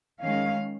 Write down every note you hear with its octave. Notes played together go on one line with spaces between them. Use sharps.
D#3 G#3 C#4 F5